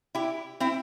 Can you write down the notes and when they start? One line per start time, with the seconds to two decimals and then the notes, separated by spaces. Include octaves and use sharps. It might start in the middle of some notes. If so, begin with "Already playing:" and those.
0.15 E4 G4
0.60 C4 E4